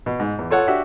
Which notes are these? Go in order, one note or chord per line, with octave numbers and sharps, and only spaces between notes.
B2
G#2
E2
F4 A4 C#5 F#5
D4 F#4 G4 E5 F#5